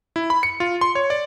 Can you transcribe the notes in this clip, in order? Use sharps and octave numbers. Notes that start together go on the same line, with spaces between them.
E4
B5
C#7
F4
C6
C#5
D5